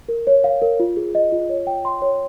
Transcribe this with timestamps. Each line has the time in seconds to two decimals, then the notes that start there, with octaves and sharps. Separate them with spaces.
0.08 A#4
0.27 C#5
0.44 F5
0.62 A#4
0.80 F4
0.97 G#4
1.15 D#5
1.32 F4
1.49 C#5
1.67 G5
1.85 C6
2.02 C#5